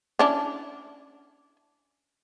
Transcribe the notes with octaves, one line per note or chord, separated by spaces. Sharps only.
C#4 D4 E4